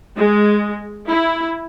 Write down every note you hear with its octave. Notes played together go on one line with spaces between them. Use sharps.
G#3
E4